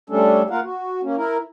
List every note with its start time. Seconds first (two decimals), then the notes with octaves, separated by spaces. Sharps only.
0.10 G3 A3 C#4 D4 A4
0.50 A#3 F4 A#4 F5 F#5
0.64 F#4
1.03 A#3 C#4
1.17 E4 A#4